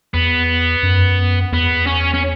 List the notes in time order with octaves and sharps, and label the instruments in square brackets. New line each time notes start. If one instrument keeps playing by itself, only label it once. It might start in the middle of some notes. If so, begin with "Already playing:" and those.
[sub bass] E2 [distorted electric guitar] B3
[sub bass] F#2
[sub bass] E2 [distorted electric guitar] B3
[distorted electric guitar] C#4
C#4